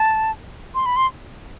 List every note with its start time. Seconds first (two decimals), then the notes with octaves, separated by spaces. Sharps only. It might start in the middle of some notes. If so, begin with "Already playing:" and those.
Already playing: A5
0.75 C6
0.86 B5
0.96 C6